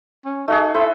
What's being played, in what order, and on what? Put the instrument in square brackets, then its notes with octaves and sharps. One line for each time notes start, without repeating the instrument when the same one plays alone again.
[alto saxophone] C#4
[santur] A3 F#4 G#4 [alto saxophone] D#4
[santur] E4 C5 E5 [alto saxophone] A4